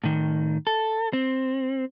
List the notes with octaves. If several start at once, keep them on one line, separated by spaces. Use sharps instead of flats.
A2 D#3
A4
C4